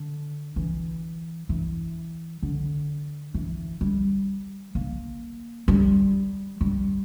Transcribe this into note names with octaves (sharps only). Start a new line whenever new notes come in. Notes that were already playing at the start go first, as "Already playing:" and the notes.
Already playing: D3
E3
E3
D3
E3
G3
A#3
G3
G3